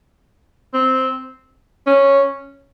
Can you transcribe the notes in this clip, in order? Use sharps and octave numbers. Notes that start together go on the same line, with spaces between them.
C4
C#4